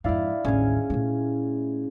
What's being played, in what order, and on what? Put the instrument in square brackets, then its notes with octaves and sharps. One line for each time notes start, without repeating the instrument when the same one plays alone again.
[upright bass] F2 G#2 [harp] E4 D5 F5
[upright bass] A1 D#2 [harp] C#4 G#4
[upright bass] A#2 A3